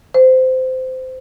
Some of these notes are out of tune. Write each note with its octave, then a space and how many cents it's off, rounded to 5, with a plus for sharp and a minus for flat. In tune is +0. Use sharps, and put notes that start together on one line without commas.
C5 -20